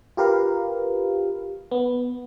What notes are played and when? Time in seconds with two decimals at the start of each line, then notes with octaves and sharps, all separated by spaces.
0.17 F4 G4 A#4 B4 F5
1.71 B3